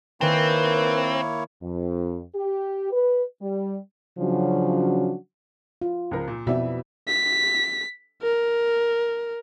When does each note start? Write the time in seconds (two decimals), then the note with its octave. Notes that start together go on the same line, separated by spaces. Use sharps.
0.21 D#3 A#3 C4 E4 B4 C#5 G#5
1.62 F2
2.35 G4
2.91 B4
3.41 G3
4.19 C#3 F3 F#3 C#4 D4 F#4
5.82 F4
6.11 C#2 F3 A#4
6.28 A#2
6.47 F2 B2 B3 E4 D5 E5
7.08 B6
8.22 A#4